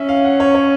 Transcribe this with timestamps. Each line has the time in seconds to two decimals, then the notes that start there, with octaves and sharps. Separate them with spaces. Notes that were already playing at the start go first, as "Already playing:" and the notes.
Already playing: C#4 E5
0.09 F5
0.24 F#5
0.40 C#5
0.55 C#5